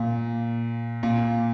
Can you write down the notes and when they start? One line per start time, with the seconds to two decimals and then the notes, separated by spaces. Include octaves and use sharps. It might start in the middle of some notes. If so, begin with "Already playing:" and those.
Already playing: A#2
1.03 A#2